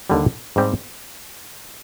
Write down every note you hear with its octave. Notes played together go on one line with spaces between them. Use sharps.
D#2 D3 G3
G#2 G3 C4 G4